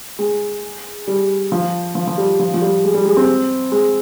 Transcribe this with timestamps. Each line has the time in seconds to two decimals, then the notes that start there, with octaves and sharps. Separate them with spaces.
0.19 G#3
1.08 G3
1.52 F3
1.95 F3
2.07 F3
2.18 G3
2.40 F3
2.54 F3
2.62 G3
2.84 G#3
2.94 G3
3.06 G#3
3.17 C4
3.72 G#3